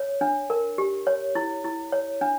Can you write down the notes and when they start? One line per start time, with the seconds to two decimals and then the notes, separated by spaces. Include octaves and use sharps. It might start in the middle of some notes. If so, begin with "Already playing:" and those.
Already playing: C#5
0.21 D4
0.50 A#4
0.78 G4
1.07 C#5
1.35 E4
1.64 E4
1.92 C#5
2.21 D4